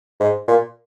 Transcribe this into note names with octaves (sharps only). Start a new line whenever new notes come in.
G#2
A#2